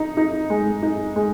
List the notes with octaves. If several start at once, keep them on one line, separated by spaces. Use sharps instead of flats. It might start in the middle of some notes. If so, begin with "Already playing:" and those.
Already playing: D#4
D#4
G#3
D#4
G#3